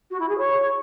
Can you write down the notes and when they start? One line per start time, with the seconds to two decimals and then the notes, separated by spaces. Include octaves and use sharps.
0.10 F#4
0.19 E4
0.29 G#4
0.38 C#5